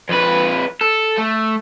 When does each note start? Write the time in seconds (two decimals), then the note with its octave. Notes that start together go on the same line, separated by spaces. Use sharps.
0.09 F2 B4
0.81 A4
1.18 A3